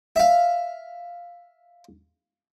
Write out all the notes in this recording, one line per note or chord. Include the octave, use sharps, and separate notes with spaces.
E5 F5